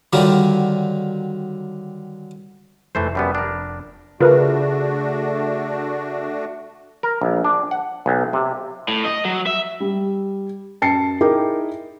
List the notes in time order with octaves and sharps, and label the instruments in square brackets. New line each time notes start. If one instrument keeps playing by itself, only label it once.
[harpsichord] D3 D#3 F#3 G3 F4
[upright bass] F1 [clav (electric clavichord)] E3 A3 C5
[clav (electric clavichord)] F#2 G3 B3
D4 A#4
[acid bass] C#3 [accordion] A3 D4 F#4 [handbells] F4 A#4 B4
[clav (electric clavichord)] A#4
A#1
D4
F#5
B1
C3
[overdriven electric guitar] A2
D#5
F#3
E5
[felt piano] G3
F#2 A5 C7 C#7
D#4 E4 G#4 A#4 G5 D6